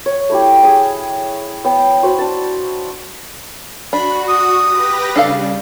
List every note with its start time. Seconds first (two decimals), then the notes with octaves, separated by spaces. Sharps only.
0.06 C#5
0.29 A3 E4 G4
0.64 G#4 G#5
1.64 B3 C#5 G5
2.03 F#4 C5 B5
2.19 D4 A5
3.93 D4 F#4 B5
4.28 D#6
4.59 G4 B4 A#6
5.16 C#3 G3 D4 A4 F5